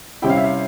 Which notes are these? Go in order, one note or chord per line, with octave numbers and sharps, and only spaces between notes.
C3 G3 C#4 E4 G5
F5
E5
F5